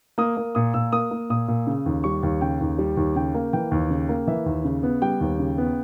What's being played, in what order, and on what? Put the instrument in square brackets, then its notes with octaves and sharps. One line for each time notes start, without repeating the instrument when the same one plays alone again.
[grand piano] A#3 D#6
A#3
A#2 D#6
A#2 E6
A#3 D#6
A#3
A#2 D#6
A#2
C#3
D#2
G3 C#6
D#2
C#3 G5
D#2
G3
D#2
C#3 G5
A#3
E3 G5
D#2
C#3
A#3
E3 E5
D#2
C#3
B3
G3 G5
D#2
C#3
B3